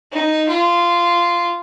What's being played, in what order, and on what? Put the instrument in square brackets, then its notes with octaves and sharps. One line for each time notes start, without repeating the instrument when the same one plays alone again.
[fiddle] D#4
F4